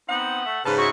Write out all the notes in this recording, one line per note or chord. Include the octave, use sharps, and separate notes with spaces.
B3 C4 D#4 F#5
A3 E5
G#2 C#3 B4 A5
G#3 E4 F#4 C#6